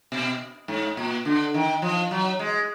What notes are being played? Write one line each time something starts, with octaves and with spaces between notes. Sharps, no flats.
B2
G#2
A#2
D3
D#3
F3
F#3
G#3